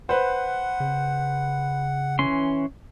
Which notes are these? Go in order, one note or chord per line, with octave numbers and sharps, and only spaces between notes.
B4 C5 F#5
C#3
E3 C#4 C6